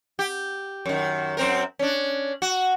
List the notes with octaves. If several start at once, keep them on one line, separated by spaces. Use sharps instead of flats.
G4
F#2 D#3
F#2 C4 A#4
C#4 D4
F#4